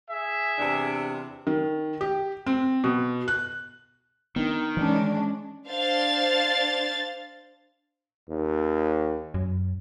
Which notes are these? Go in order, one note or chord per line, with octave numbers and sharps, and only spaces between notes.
G#4 E5
E2 C3 D4
D#3
G4
C4
B2
F#6
D#3 B3 D4
E3 G#3 C#4 D4
D4 C5 F5 A6
D#2
F#2